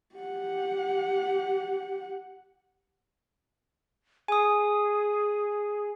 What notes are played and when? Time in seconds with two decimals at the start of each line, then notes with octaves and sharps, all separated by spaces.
0.16 G4 F#5
4.28 G#4 G#5 D#6